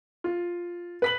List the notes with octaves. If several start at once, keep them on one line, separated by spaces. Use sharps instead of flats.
F4
B4 B6 F#7